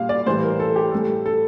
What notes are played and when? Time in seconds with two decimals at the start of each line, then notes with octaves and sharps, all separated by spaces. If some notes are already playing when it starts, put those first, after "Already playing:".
Already playing: A#2 G3 F5
0.09 D5
0.26 A2 E3 G3 C5
0.43 A#4
0.60 A4
0.76 G4
0.92 A2 G3 A4
1.26 A4